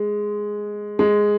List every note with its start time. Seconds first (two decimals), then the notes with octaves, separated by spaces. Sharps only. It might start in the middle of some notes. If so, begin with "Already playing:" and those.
Already playing: G#3
0.99 G#3